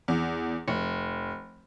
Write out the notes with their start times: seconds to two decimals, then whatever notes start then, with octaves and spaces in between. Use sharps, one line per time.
0.08 E2
0.68 F1